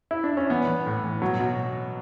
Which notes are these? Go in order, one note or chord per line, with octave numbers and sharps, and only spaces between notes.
E4
D4
C#4
E3 B3
E3
A2
E3
B2 F#3
B2